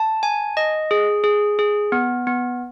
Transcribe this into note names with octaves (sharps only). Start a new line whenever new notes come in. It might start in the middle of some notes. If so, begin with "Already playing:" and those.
Already playing: A5
G#5
D#5
G#4
G#4
G#4
B3
B3